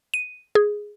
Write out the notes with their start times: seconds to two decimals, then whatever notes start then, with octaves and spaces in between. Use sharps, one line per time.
0.14 D#7
0.55 G#4